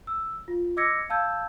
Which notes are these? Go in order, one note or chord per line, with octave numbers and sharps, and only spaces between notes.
E6
F4
D#5 D6 E6 G#6 A#6 C#7
F5 A5 E6 G6 G#6